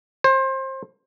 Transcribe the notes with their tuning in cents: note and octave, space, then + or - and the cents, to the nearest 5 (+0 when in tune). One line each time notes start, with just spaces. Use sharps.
C5 +25